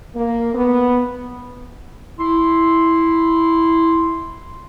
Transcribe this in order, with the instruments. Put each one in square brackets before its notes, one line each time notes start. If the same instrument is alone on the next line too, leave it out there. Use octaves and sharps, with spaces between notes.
[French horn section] A#3
B3
[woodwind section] E4 C6